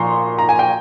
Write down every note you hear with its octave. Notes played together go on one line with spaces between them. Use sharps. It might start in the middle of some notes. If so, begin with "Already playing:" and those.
Already playing: A#2 F3 A#5 C6 C#6
A#5
G#5
G5